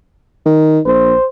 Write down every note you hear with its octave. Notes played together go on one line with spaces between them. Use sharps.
D#3
A#1 C5